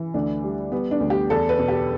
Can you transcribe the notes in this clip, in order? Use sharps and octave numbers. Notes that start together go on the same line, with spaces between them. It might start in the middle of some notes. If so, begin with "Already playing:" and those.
Already playing: E3
D2 D4
G3
G3 B3
D4
D2
G4
E2 A4
B4
B2
G4